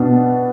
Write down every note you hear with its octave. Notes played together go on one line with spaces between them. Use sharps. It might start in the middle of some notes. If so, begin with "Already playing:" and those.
Already playing: B2 B3 D4